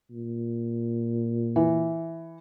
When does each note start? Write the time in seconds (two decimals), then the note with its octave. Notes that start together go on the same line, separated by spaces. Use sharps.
0.11 A#2
1.56 E3